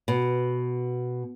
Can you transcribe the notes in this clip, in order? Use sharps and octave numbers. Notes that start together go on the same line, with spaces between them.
B2